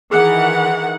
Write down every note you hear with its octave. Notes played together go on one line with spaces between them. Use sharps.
D#3 E3 G#4 F#5